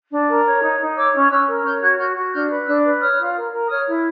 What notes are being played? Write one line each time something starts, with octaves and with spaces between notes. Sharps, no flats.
D4
A#4
C#5
D#4
D#4
C#5 D6 E6
C#4
C#4 E6 F#6
A#4
C#5 F6 G6
F#4 F#6 G#6
F#4 F6 G6
F#4
D4 F6 G6
B4
D4 E6 F#6
B4
C#5 D#6 F6
F4
A#4
A#4
C#5 D#6 F6
E4